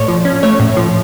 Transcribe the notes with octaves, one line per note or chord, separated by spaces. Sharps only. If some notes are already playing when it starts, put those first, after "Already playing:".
Already playing: A2 A3 C#5 D5
F3
C#4
A3 C#5
A2
F3